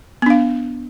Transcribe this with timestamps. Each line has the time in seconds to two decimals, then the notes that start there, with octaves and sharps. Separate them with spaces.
0.22 B3
0.26 D4
0.30 F5